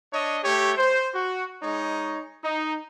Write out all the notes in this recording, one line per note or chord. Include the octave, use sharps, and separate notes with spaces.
D4 C#5 D#5
A3 G4 C#5
C5
F#4
G#3 D#4 C#5
D#4